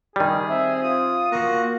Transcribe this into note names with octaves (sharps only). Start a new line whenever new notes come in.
D#3 G3 G#4
C4 E5
F4 D#6
A#3 F#4